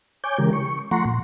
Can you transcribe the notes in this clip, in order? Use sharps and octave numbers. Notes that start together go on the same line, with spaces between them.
C#5 G#5 D6 G6
C#3 E3 G#3 G4 A#4
C#6
F3 A3 F#5 A#5 C6 C#6
A#2